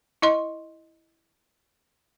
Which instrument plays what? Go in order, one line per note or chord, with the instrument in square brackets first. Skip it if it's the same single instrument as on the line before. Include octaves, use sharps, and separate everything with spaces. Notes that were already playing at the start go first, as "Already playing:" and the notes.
[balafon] E4 D#5 C6